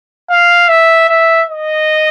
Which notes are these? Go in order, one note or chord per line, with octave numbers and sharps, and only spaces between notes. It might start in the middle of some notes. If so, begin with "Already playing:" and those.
F5
E5
E5
D#5